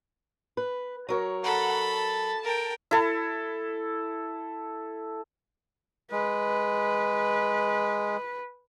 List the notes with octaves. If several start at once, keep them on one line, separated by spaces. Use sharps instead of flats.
B4
F#3 A#4 C#5
A4 F#5 A#5 B5
A5
A#4 G5
E4 A4
G#3 B4